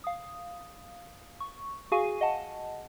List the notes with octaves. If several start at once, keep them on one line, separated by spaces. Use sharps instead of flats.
F5 D#6
C#6
F#4 G#4 F5 G#5 C#6 D#7
D#5 F#5 A5